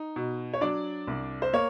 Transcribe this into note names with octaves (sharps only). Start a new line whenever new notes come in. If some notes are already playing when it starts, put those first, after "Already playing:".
Already playing: D#4
B2
C#5
F#3 D4 D5
C2
C5
A#3 C#5